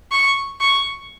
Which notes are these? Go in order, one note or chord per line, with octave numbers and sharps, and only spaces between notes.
C#6
C#6